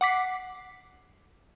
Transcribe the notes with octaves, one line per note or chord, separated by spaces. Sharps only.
F#5 D6 B6 C7